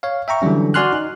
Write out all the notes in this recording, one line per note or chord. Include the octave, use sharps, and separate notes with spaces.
C#5 F5
E5 G5 A#5 C#6
D3 E3 F#3 G3 C#4
F#4 D5 G#5 C6 F6 F#6
D#4